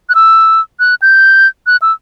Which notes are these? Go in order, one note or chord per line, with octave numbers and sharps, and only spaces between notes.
F#6
E6
F#6
G6
F#6
E6